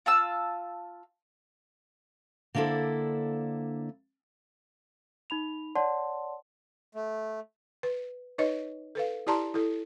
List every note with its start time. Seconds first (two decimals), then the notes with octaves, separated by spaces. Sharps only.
0.06 F4 A5 E6
2.55 D3 A#3 D4 E4 A4 C5
5.30 D#4 B5 F7
5.75 C#5 D5 F#5 A5 C6
6.94 A3
7.83 B4
8.38 D#4 B4 C#5 D#5
8.95 A4 B4 F5
9.27 E4 G4 D5 A5 A#5 C6
9.54 E4 A4